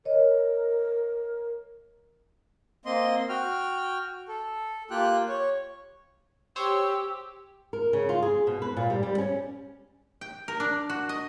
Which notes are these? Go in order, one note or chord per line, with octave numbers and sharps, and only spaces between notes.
A#4 C#5 D#5
A#3 C4 D#5 C6
F#4 G5 F6
A4
A#3 F4 G4 G5 F#6
C#5
G4 C5 C#5 E6
A#4
C#3
F4
G#4
B2
B4
A#2
G3
G3
C#4
G5
A#4
D4
F#4
D#5